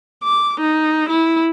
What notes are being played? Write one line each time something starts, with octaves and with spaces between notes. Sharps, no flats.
D6
D#4
E4